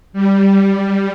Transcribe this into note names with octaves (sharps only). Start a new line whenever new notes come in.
G3